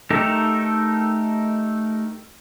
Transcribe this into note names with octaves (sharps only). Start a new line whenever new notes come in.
A3 D#4 G4 A4 A#4